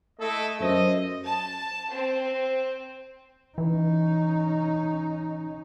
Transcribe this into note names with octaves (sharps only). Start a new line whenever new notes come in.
A3 E4 A4 D#5
F#2 C5 D#5
A5
C4
E3 C#4 D#4